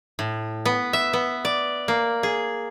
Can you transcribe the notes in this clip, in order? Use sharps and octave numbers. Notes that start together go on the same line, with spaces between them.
A2
B3
E5
B3
D5
A#3
G#4